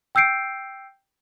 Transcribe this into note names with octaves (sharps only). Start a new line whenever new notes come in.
G5 E6 G6 C7 D7